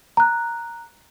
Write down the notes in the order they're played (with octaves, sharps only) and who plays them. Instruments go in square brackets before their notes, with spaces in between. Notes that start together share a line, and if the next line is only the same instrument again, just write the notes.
[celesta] A#5 F#6